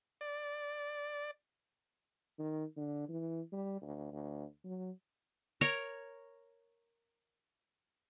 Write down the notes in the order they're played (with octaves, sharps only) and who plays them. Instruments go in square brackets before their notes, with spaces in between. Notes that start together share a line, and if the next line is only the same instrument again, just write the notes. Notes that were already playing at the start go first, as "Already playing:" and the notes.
[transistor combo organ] D5
[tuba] D#3
D3
E3
G3
D2
D2
F#3
[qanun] A#4 C#5 A#5